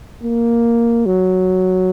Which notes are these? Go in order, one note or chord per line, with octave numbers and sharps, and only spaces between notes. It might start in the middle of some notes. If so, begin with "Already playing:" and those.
A#3
F#3